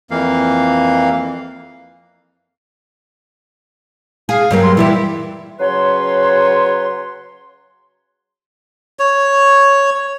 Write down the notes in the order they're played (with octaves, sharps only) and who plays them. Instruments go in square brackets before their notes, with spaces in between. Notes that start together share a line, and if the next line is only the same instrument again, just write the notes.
[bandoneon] F2 E3 A#3 F5
[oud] G#4 [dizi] F5
[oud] G2 F#3 A#3
[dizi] C6
[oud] E3 G3 G4 [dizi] E4
[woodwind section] C#3 F#3 B4 C#5 C6
[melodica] C#5